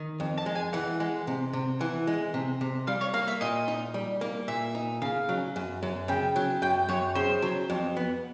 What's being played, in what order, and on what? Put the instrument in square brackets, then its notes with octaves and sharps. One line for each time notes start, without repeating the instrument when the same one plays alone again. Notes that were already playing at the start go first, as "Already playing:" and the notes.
Already playing: [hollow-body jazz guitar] D#3
F2
[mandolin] A5
[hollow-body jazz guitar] G#3
[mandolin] G#5
[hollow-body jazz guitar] E3 [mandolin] F#5
[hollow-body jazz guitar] G#3
C3
C3
[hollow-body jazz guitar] E3 [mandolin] F#5
[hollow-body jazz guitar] G#3
C3
C3
[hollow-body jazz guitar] G3 [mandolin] F5
[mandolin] C#5
[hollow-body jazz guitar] A#3 [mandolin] F5
[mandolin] E5
[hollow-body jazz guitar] A#2 [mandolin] D#5
[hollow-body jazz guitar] D#4
G3
A#3
[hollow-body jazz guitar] A#2 [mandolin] E5
[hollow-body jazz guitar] D#4
[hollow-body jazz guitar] C#3 [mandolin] F5
[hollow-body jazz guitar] F#3
F#2
F#2
[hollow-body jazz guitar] C#3 [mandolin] G5
[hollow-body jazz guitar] F#3
[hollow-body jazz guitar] F#2 [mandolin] G5
[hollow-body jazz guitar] F#2 [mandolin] C#5
[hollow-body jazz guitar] C#3 [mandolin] C5
[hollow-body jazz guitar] F#3
F2
B3